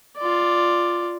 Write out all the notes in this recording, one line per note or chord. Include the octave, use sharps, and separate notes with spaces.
F4 D5